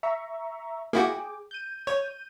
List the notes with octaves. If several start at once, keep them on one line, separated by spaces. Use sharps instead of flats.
E5 A#5 C#6
A#3 E4 F#4 G#4 G5 D6
G6 D#7
C#5